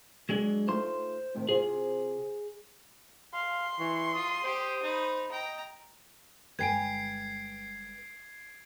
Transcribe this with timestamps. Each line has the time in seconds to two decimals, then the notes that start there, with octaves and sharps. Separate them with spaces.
0.29 F#3 G#3 D4
0.68 A3 D#4 F4 C5 C6
1.35 A2 C3 D#3
1.49 C3 C4 F4 G#4
3.33 F5 C6
3.79 E3 C#6
4.14 F4 D#6
4.44 G4 C5
4.83 D#4 B5
5.31 D#5 G5 A#5
6.59 G1 G#3 B4 G5 G#5 G#6 C7 D7